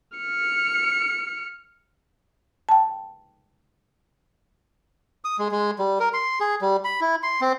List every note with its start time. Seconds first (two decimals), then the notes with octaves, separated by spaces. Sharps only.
0.17 F6 C#7
2.69 G5 A5
5.25 D#6
5.39 G#3
5.52 G#3
5.79 G3
6.00 A#4
6.14 C6
6.40 G#4
6.62 G3
6.85 B5
7.01 E4
7.23 C6
7.41 C4